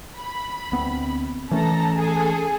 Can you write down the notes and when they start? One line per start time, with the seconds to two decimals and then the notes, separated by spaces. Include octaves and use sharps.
0.18 B5
0.72 D2 B3 C4
1.51 E3 A3 C#4 A4 A5 A#5
1.96 G#4 A4 G#5